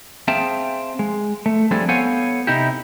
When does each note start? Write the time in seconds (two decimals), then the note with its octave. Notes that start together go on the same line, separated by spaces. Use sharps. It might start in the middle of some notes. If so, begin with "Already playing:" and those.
0.28 C4 G#4 E5 F5 G5 A5
0.99 G#3
1.46 A3
1.71 F3 G3 C4 D4 G#4 A4
1.88 B3 A4 C5 C#5 F5 G#5
2.47 C3 D#4 E4 G4